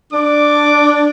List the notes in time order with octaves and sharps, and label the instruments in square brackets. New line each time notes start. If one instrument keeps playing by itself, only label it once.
[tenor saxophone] D4 [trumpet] D6